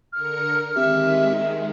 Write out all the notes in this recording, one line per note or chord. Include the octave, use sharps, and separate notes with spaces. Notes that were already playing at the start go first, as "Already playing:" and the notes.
D3 A#4 F6 C#7
D#3 G#3 C4 G4 E5